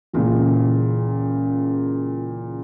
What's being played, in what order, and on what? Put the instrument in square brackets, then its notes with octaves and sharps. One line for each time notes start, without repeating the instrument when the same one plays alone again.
[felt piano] C#2 A#2 E3